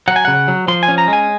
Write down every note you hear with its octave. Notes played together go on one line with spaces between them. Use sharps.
F#3 F#5
G#5
C#3 F#5
F#3
F3 C6
G#5
C#4
A#5
G#3 G#5